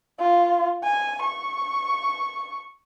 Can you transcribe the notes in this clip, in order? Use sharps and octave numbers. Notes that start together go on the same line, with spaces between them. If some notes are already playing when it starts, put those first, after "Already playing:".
F4
G#5
C#6